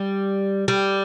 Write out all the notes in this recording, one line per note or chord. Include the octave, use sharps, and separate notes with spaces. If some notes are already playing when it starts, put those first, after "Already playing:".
Already playing: G3
G3